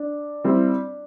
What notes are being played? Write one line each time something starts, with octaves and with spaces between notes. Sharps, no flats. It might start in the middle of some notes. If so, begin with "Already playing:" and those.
Already playing: D4
G3 C4 E4